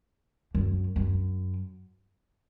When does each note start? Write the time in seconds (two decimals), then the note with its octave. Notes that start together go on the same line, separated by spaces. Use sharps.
0.55 F#2
0.96 F#2